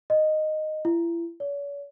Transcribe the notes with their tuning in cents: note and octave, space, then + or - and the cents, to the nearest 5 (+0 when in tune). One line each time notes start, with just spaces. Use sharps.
D#5 -10
E4 +35
C#5 +45